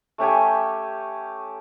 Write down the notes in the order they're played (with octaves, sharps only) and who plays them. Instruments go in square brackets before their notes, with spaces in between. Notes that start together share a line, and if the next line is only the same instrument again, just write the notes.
[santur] A3 C#4 G4 G#5